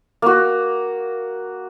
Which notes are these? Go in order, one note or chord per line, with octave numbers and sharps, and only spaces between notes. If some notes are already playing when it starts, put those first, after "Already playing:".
A#3 F#4